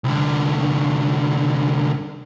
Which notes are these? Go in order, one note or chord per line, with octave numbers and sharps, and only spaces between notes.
C2 D3